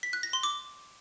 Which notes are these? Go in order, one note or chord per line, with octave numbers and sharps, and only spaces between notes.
B6
F#6
A#6
C6
D6